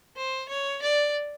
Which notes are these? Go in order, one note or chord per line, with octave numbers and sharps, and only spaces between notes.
C5
C#5
D5